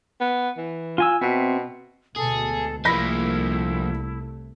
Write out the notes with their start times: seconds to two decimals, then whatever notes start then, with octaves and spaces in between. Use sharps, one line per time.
0.20 B3
0.57 E3
0.98 F4 G#5 E6
1.21 B2 C4 E5
2.16 D2 B2 G#3 G#4 A4
2.85 C2 F3 A3 A#3 E4 B5 A#6 B6